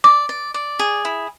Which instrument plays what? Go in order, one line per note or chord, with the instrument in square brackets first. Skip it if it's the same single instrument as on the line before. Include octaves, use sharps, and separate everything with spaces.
[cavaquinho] D5 [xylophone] D6
[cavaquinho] D5
D5
G#4
E4